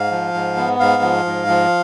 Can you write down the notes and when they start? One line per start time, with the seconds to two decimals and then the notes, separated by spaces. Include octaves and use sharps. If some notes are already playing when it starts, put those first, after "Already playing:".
Already playing: G#2 F5
0.11 F3
0.34 G#2
0.57 B3
0.80 G#2 F5
1.02 F3
1.25 G#2
1.48 F3